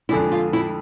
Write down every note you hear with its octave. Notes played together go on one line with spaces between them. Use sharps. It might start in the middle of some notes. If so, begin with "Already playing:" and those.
F2 D3 G#3 D4 E4
F4
E4